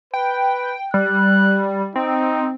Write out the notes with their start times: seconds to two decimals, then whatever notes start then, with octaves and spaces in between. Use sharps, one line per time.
0.14 B4 G5
0.94 G3 F#6
1.96 C4 D#4